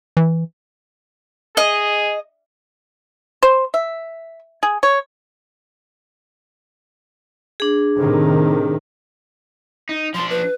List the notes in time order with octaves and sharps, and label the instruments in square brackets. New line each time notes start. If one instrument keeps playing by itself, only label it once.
[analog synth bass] E3
[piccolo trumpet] G#4 [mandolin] D#5
[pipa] C5
E5
G#4
C#5
[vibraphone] D4 G#4
[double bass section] A2 C3 D#3
[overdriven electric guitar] D#4
[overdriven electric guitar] F3 D4 [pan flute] C6
[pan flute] B4